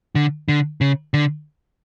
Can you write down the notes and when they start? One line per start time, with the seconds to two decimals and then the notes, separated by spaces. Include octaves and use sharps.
0.15 D3
0.49 D3
0.81 C#3
1.14 D3